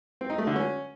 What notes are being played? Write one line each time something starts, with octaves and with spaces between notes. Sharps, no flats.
C4
D#4
A3
D3
C#4